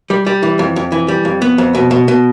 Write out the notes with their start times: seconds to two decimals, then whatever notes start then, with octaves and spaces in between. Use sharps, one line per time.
0.10 G3
0.27 G3
0.43 E3
0.59 F2
0.76 F2
0.92 E3
1.08 G3
1.25 F2
1.42 B3
1.58 F2
1.75 B2
1.91 B2
2.08 B2